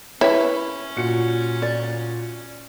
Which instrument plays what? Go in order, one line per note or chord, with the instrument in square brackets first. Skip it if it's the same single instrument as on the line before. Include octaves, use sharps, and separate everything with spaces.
[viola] C#4 [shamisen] E4 B4 [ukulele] C#5
[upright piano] A#2 F#4 C#7
[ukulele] D5